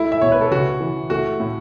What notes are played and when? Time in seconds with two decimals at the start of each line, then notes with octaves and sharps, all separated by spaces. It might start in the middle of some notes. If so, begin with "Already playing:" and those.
Already playing: A3 E4
0.12 E5
0.21 B2 C#5
0.32 B4
0.41 A4
0.51 C#3 F#4
0.80 E3
1.10 A3 F#4
1.40 A2